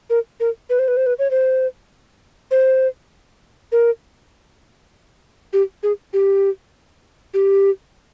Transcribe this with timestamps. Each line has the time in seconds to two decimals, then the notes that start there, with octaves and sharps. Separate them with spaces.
0.10 A#4
0.40 A#4
0.70 B4
0.79 C5
0.88 B4
0.97 C5
1.06 B4
1.19 C#5
1.31 C5
2.51 C5
3.72 A#4
5.53 G4
5.83 G#4
6.13 G4
7.34 G4